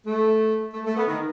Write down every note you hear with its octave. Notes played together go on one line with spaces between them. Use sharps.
A3
A3
A3
B3
D#3